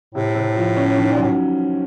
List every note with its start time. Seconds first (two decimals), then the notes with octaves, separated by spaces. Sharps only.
0.14 A2 C3
0.35 C3
0.56 F3
0.76 C#4
0.98 D#3
1.13 A#2
1.18 A2 F#3